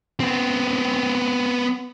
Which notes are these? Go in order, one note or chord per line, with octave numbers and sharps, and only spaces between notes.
B3 C4